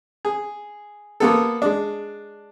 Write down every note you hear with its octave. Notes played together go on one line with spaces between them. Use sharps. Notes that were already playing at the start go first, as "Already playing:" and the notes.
G#4
A#3 B3 A4
G#3 D4